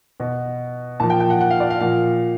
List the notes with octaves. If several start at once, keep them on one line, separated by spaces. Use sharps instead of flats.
B2
A#2 F3 A5
G5
G5
F#5
F#5
F5
D5
F5
A#2 F3 F5